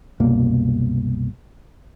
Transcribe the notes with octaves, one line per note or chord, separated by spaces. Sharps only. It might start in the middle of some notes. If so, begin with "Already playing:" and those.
C2 F#2 B2 A#3